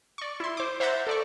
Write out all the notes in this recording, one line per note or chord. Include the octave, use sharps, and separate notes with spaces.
D5 C#6
E4 C6
C5 D6
C5 E5 F#5 A#5 G6 A6
A4 D5 C#6